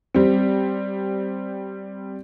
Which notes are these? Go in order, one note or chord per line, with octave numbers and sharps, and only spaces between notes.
G3 C4